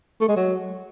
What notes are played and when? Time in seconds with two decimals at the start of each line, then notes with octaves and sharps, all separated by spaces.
0.21 A3
0.29 G#3
0.36 F#3